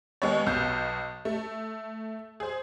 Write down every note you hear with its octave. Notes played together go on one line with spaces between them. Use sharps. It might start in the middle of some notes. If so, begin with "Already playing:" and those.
D#2 G#3 B3 C#5
B1 B2 B3 G6
A3
G#4 C5